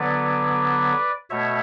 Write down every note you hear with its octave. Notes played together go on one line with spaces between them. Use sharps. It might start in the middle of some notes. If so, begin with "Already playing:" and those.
Already playing: D3 F#3 B3 B4 D5
B2 A3 C#5 E5